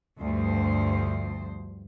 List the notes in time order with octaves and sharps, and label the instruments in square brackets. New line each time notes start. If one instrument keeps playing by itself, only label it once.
[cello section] D2 G2 F3 C5